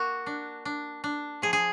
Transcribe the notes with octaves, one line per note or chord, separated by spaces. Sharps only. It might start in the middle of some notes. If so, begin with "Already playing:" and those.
Already playing: A#3 F#4
D4
D4
D4
F3 G#4
G#4